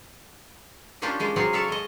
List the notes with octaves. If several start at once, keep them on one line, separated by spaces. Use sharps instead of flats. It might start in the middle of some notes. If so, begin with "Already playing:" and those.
G3 A#3 C#4 D4 F4 G4
G#3 A#3 F4
C#3 F#3 C4 F4 G#4 G#5
A4 C#5 D5 E5 F5
G#3 D#5